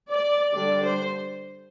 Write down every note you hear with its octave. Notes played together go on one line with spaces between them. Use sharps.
D5
D3 G3 D4 D5
C5